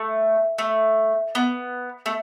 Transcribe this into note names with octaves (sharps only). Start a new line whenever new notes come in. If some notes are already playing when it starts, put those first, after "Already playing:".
Already playing: A3
A3
B3
A3